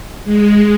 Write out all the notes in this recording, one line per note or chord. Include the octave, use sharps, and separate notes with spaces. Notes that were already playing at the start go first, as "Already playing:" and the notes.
G#3